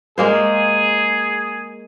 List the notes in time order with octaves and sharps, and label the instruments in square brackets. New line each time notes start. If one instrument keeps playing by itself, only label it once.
[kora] G#3 A#3 C5 [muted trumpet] G#4